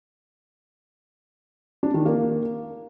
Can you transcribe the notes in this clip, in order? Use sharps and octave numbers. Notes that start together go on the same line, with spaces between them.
D4
D#3
A#3